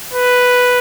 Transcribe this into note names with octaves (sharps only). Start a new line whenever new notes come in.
B4